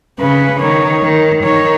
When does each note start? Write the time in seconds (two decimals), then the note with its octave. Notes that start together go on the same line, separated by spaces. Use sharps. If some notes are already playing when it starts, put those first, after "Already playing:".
0.19 C#3 B4
0.60 D#3 C#5
1.03 D#3
1.44 D#3 C#5